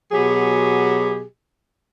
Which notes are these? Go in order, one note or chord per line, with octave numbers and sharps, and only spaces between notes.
B2 F#3 G4 G#4